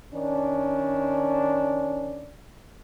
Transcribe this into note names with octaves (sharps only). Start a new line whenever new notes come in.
D#3 C#4 D4